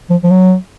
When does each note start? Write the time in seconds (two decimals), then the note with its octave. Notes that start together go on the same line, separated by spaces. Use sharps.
0.10 F3
0.23 F3
0.31 F#3